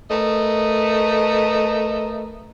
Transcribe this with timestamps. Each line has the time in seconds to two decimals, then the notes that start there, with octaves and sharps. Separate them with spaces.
0.09 A3 A#4 B4 D#5